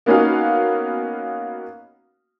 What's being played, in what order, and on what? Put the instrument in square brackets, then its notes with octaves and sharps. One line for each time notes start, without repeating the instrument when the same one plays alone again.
[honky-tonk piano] A#3 B3 C#4 D#4 F#4 F5